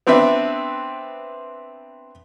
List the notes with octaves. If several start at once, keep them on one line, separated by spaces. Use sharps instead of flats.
B3 C4 D4 B4 E5